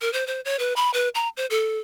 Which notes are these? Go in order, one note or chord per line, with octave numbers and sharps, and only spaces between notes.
A#4
C5
C5
C#5
B4
B5
B4
A#5
C5
A4